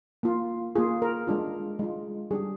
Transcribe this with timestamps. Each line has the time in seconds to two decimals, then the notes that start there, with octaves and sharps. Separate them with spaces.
0.23 A#3 F4
0.76 A#3 F4 G#4
1.02 A#4
1.27 G#3 D4 F4
1.79 G#3 D4 F4
2.31 G3 D4 G4 G#4